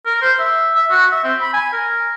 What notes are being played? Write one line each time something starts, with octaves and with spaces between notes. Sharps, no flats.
A#4
C5
E5
E5
F#4
E5
C4
B5
G#5
A#4